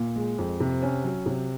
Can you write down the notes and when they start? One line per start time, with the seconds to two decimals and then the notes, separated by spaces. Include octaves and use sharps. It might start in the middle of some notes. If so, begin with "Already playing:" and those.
Already playing: A#2
0.16 G#3
0.38 F2
0.60 C3
0.82 C#4
1.04 F#3
1.26 C3